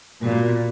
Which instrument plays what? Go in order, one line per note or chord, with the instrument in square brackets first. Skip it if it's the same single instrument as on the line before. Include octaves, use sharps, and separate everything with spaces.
[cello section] A#2 [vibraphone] B3 F#4 A#4